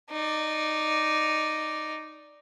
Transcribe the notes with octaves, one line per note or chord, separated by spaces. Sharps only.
D#4 D5